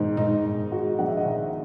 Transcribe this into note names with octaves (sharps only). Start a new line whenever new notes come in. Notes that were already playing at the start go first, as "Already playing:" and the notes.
Already playing: G#2 D#3 D#4
G#2 D#4
G#2
G#3 F#4
A#1 F#5
E5
D#5
D#3 E5